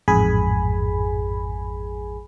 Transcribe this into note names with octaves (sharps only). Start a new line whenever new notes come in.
A1 F2 G#2 G#4 G#5 B5